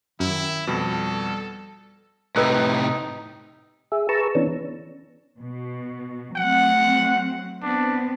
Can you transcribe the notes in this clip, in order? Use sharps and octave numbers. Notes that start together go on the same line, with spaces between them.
F#2 D#3 E4
F2 B2 G3 A4
A2 C3 D#4 B4 E6 F#6
G#4 E5
G#4 B4 A5 A#5 C#6 E6
E3 B3 C#4 D4
B2
F#3 A3 C4 F#5
B3 C4 D4